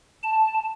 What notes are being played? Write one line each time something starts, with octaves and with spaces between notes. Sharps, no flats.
A5